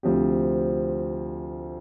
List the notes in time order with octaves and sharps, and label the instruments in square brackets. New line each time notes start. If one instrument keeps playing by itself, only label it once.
[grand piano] D2 C3 F3 C4 G4